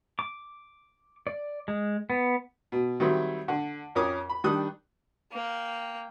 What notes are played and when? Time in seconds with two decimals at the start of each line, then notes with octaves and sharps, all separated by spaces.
0.19 D6
1.27 D5
1.68 G#3
2.10 B3
2.72 B2
3.00 D#3 F#3 G3 C4 E4
3.48 D3
3.95 F2 C#4 A#4 D6 D#6
4.30 B5
4.44 D#3 G3 D4 D#6 F#6
5.32 A#3 G5